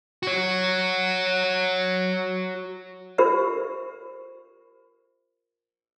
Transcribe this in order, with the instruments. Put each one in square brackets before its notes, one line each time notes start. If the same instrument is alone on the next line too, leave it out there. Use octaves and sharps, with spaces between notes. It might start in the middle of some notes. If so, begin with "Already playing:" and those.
[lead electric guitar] F#4 C#5
[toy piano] F4 G4 A#4 C5 E5